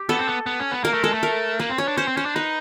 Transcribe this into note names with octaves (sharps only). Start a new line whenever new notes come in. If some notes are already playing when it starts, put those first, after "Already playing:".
Already playing: G4
B3 A4
C4
B3
B3
C#4
B3
A#3 A#4
A3
G#3 A4
A3
A#4
A#3 B4
C4
C#4 C#5
D4
C#4 C5
C4
C#4 C5
D4
D#4 B4